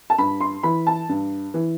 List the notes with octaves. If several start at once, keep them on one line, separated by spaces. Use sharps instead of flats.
A5
G2 B5
C6
E3 B5
A5
G2
E3